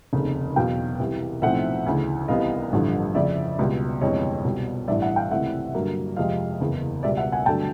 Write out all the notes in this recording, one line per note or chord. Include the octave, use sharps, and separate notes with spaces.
F1 D#2 C#3
E2 B2 F#3 F5 G5
C2 C3 E3
B1 A2 F3 A3 C4 E5 F#5
D2 C#3 E3
C2 C3 E3 G3 B3 D#5 F5
A1 G2 D3 F3 A3
F2 C#3 F3 D5 E5
C#2 B2 G3
G1 F2 C3 E3 G#3 C#5 D#5
C2 B2 G3
A1 G2 E3 D5 E5
E5 F#5
F5 G5
C#2 C3 E3 A3 C4 E5 F#5
G2 D3 F#3 A#3
F2 C3 F3 G#3 C4 D#5 F5
F#1 E2 C#3
C#2 B2 G3 D5 E5
E5 F#5
F#5 G#5
G2 D3 F#3 A3 G5 A5